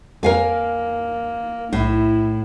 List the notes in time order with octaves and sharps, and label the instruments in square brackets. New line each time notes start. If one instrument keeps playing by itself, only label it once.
[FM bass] F2 [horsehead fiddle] A#3 [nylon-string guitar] A#4 F5 G#5
[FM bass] B1 [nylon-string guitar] A2 [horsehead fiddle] E4